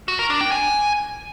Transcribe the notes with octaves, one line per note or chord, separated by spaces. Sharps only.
F#4
A#4
D4
G5
G#5